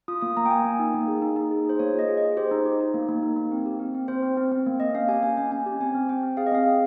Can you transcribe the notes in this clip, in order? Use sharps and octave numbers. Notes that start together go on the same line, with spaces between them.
F4 D#6
A#3 D#6
A#3 A#5
G5
A#3 G#5
A#3
D#4
A#3
G#4
D#4
D#4
G#4
G#4 C5
A#3 C#5
F4
D#5
G#4
D#5
G#4
G4 C5
D#4
G4
D#4
A#3
A#3
D#4
A#3
C4
G4
C4
C4
C4 C5
C4
C4
C4
A#3
A#3 D#5
C#4 F5
G4 G#5
C#4 G#5
C#4 G#5
C#4 G#5
G4
C4 G#5
C4
C4 G5
C4
G#4 F5
D#5
C4 F5
G#4